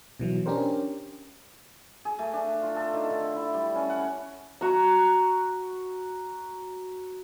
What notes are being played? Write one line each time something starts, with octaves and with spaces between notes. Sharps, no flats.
B2 E3 F#3
C#4 D4 G4 A#4 C5
G#4
A3
D4
F4
A4
D#3
D3
E4
G3
C#4
F#5
F#4 A#5